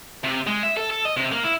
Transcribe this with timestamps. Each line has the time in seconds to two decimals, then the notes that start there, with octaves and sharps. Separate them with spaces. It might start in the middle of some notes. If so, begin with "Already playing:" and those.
0.24 C3
0.47 G#3
0.63 E5
0.77 A4
0.90 A4
1.05 D#5
1.17 C3
1.32 A#3
1.44 E4